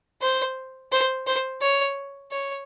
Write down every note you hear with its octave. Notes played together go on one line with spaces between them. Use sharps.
C5
C5
C5
C#5
C#5